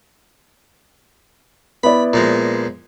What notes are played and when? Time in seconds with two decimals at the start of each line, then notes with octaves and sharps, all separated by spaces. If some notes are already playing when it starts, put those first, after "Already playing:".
1.83 B3 E4 D5 B5
2.13 A#2 F3 G#3